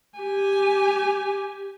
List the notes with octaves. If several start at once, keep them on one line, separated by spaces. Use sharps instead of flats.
G4 G#5